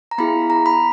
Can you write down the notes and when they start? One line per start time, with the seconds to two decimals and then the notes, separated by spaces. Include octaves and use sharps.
0.11 A#5
0.18 B3 E4 G#4 B5
0.50 A#5
0.66 B5